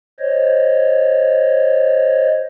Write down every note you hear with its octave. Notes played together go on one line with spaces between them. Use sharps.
C5 C#5 D#5